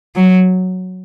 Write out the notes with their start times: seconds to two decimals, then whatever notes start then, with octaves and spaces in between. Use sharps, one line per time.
0.16 F#3